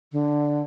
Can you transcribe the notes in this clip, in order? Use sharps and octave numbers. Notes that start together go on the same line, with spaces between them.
D3